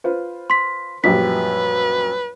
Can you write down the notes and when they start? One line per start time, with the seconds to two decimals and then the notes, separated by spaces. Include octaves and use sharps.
0.04 F4 B4 C5
0.50 C6 B6
1.04 A#1 F#2 G3 B4 B6